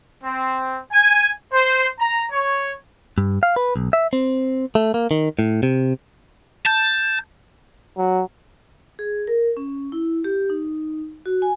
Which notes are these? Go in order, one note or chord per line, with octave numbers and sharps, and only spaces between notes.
C4
G#5
C5
A#5
C#5
G2
F5
B4
B1
E5
C4
A3
A#3
D#3
A2
C3
A5 G6
F#3
G#4
A#4
C#4
E4
G4
D#4
F#4
G#5